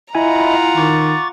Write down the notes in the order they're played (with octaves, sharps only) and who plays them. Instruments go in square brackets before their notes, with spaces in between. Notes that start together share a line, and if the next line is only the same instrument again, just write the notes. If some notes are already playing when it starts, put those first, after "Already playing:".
[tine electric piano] E4 G#5 [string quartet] F4 F#5 A#5 [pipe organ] D#5 E5 B5
[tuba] D#3 [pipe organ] C#6 D6 A6